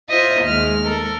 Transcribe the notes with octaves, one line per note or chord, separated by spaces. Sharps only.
F4 C5 D#5 E5
D#2 G#3 F6
A4 A#4